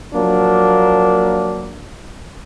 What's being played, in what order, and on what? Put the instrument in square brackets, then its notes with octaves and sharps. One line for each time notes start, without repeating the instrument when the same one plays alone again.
[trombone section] F3 F#3 A#3 D4